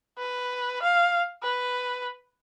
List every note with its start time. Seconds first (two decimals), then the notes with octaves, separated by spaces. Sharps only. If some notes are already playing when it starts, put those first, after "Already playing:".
0.19 B4
0.82 F5
1.43 B4